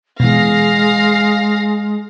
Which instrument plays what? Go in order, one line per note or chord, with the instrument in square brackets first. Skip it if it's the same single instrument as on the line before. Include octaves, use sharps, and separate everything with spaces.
[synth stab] B2 E3 [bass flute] G#3 [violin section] F5 A#6 C7